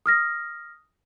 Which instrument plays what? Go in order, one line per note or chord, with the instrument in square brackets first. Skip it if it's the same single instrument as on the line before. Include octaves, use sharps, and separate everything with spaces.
[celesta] D#6 F6 A#6